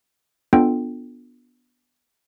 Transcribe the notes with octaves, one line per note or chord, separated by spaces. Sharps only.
B3 D4 F4 A4 G5